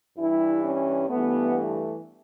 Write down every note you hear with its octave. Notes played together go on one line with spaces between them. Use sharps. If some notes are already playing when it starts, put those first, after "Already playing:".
G2 E3 G3 E4
C#4
G2 E3 A3 B3
A3